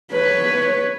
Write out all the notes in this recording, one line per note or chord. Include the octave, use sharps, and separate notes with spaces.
B4 C#5